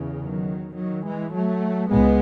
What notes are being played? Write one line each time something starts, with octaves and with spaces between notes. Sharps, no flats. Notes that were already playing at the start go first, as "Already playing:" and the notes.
Already playing: E2 C#3
D#3 F#3
D#3 F#3
E3 G#3
F#3 A3
C#2 G#3 B3